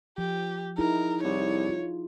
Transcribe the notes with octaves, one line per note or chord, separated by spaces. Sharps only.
F3 G4
D#4 E4 G#4 A#4
C2 C#5
F4